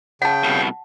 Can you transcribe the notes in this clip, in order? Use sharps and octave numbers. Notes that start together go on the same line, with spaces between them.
C#3 F#5 G5 A5
C2 B2